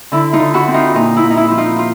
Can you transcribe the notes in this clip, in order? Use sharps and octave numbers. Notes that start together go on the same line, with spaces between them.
D3 E4
D#4 F4
D3
E4 F#4
C4
D#4 F4
A#2 D#4
E4
A#2
D#4
E4
F3 E4
D#4 F4
F4